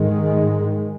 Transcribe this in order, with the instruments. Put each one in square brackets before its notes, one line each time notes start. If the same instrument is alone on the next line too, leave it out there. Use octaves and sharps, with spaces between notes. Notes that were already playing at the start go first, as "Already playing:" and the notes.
Already playing: [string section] G#2 D#3 G#3